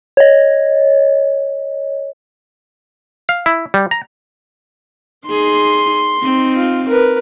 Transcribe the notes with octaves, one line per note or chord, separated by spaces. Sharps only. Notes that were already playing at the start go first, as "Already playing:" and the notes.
C#5 D#5
F5
E4
G3
A#5
D#4 G#4 C6
C4 D#4
F4
A#4 B4